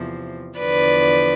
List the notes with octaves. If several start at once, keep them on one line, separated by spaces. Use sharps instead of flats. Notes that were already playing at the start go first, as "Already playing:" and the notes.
Already playing: E2 C3 F3
E2 D3 F3 B4 D5